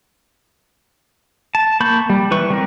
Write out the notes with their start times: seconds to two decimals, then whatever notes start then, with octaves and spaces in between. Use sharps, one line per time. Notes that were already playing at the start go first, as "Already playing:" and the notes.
1.55 A5
1.80 A#3 B5 C#6 G6
2.10 G3
2.31 E3 B4 C#6
2.50 G3 C4 A#4